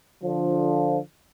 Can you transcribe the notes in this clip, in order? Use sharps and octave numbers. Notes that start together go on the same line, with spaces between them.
D3 F3